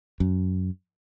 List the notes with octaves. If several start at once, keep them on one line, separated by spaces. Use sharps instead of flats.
F#2